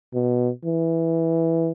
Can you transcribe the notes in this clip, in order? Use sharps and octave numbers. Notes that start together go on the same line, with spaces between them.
B2
E3